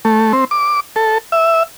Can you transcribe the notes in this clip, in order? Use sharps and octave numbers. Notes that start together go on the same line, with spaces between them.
A3
C4
D6
A4
E5